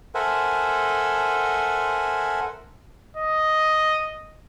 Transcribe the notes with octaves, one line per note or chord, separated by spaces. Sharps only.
A4 A#4 C5 E5 F#5 G#5
D#5